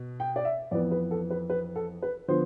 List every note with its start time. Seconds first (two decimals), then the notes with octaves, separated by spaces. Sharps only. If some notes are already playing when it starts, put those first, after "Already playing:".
Already playing: B2
0.20 G5
0.36 D5
0.45 E5
0.71 F2 E3 B3 D5
0.91 B4
1.11 A4
1.30 B4
1.50 B4
1.76 A4
2.02 B4
2.28 D3 F3 B3 C5